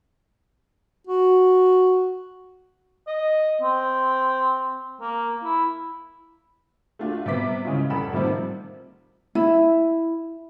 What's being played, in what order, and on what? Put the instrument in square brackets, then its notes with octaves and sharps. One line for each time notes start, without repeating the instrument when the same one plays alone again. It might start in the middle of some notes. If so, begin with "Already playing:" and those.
[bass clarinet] F#4
[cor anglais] D#5
C4
A#3
E4
[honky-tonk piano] A3 D4 F4 F#4
C3 G3 B3 D6 B6
C#3 E3 G#3 C#4 F4
F1 G3 A4 F#5 B5 E7
C3 D#3 F3 G3 C4
[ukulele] E4